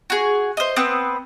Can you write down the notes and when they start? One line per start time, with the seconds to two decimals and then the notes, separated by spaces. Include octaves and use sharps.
0.10 F#4 G#4
0.57 C5 D#5
0.76 B3 C4 B4 D#6